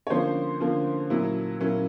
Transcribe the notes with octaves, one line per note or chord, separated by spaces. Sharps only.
C#5
D3 F3 A#3 C#4 C5
D3 F3 A#3 C#4
A#2 F#3 A#3 C#4 E4
A#2 F#3 A#3 C#4 E4